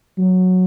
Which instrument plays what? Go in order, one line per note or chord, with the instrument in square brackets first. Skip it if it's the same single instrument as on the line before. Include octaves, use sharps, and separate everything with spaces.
[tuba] F#3